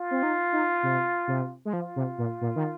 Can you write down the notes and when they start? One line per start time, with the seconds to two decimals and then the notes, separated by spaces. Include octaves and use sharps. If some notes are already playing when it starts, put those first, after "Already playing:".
Already playing: F4
0.11 C4
0.23 D#4
0.52 D#4
0.83 C3
1.27 C3
1.65 G#3
1.73 F3 F4
1.96 C3
2.18 A#2
2.41 A#2
2.56 D#3